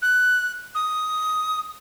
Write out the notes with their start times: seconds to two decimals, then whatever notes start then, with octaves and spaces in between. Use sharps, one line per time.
0.02 F#6
0.75 D#6